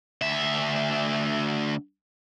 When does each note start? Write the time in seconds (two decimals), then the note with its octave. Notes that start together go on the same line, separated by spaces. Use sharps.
0.22 D2 E5